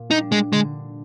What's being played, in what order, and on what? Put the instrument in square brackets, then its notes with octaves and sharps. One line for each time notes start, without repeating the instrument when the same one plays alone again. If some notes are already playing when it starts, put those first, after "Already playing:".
Already playing: [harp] A#2
[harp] G3 D4 [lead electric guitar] D#4
[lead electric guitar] G#3
[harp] D3 [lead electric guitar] G#3